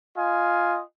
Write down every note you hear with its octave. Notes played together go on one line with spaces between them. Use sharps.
F4 D#5 F5 G#5